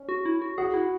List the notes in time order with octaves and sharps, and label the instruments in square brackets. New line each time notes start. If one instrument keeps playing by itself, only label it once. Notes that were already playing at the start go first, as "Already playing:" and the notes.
Already playing: [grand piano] C#4
[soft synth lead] F#4
E4
F#4
[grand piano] F#4 [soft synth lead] G#4
[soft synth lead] E4